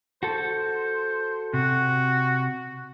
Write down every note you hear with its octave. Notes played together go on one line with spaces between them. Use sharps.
F#4 A4 C5
C3 F#4